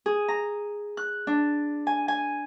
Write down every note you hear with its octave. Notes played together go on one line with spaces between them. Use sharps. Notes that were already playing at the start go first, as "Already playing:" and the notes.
G#4
A#5
F#6
D4
G#5
G#5